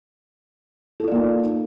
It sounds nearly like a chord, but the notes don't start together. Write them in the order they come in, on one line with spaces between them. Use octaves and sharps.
A4 F4 D5 A#3 D#4